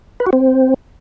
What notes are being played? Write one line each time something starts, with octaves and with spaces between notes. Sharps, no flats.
B4
F#4
C4